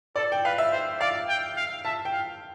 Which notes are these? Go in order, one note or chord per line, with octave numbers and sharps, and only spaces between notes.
A4 D5
G5
B4 F5
E5
C5
D5 F5
G5
F5
E5 A5
G5
F5